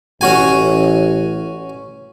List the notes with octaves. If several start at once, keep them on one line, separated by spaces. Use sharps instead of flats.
A1 C#4 F#4 G#5